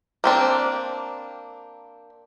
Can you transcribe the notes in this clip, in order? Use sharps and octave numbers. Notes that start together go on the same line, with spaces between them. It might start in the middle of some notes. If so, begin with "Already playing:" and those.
A#3 C4 D4